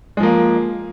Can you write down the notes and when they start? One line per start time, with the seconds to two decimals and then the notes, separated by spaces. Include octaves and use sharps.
0.17 G#3
0.20 F3
0.23 A#3